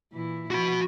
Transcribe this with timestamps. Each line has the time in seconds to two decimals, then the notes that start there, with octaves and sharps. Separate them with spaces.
0.12 A#2 E3 E4
0.51 F3 F#4 B5